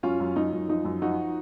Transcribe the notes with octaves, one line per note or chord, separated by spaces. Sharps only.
F#2 C#4 F4
F#2
F#2 D#4
F#2
F3 D#4
F#2
F3 D#4 F#4